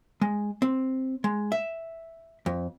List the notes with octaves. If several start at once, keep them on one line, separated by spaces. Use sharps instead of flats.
G#3
C4
G#3
E5
F2